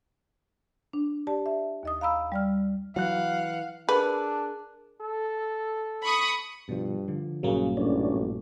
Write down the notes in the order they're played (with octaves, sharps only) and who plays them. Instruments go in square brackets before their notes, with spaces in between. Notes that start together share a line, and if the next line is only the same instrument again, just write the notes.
[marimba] D4
G4 D5 A5
E5
D#2 D#5 D#6
F5 A#5 B5 E6
G3 D5 F6
[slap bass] E3 [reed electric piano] F#3 F#6 [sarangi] F5 [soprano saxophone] F#5
[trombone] D4 [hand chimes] G#4 A#4 F#6 [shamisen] B4
[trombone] A4
[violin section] B5 C#6 D#6
[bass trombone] G2 [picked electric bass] B2 F3
[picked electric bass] D3 F3
[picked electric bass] A#1 G2 A#2 [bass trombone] C#3 [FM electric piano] F#3 A#3
[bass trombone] A1 [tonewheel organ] C#4 D4